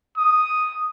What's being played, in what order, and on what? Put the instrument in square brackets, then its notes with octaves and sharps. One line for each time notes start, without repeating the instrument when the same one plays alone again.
[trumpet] D#6